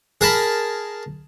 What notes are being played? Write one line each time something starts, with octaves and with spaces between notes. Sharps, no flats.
G#4 A#4 A5 B5